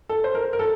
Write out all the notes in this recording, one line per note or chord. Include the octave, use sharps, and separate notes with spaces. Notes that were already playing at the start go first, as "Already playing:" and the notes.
A4
C5
A#4
A#4
A4